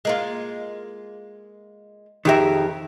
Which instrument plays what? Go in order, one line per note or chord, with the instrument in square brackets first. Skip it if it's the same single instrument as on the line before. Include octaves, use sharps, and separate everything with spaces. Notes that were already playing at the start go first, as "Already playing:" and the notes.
[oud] G#3 A#3 F4
[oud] F2 G#4 E5 [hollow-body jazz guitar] D#3 G4 A#4